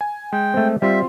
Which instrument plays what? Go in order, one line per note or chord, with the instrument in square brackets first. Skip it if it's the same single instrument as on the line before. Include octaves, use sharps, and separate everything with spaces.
[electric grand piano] G#5
[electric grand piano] G#3 [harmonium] G5
[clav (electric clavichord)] A3 C4
[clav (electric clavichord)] G3 [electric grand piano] C4 F4 C6 [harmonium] E5